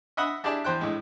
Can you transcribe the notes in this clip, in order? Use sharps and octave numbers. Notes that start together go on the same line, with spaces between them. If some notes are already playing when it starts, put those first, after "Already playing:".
D#5 E5 F#5 B5 D#6
D4 E4 G4 G#4 D5 A5
E2 C5 G5 F#6
A2 G#3